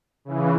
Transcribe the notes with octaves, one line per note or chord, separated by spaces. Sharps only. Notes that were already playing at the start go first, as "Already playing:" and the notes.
C#3 E3